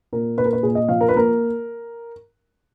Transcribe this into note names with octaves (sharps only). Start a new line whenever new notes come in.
A#2 A#4
A#2 B4
A#4
B4
A#2 G#4
D#5
F3 F5
A#4
B4
A#3 A#4